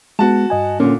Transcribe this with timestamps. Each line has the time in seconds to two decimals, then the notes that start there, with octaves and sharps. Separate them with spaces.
0.19 G#3 B3 F#4 A5
0.50 G2 D#5 G#5
0.80 A#2 D3 C#4